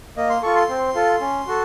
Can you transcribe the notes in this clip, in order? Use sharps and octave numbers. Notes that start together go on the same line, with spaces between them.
A#3 D#5
C6
F4 A4 C#6
C6
C4
F4 A4
C#4
F#4 A4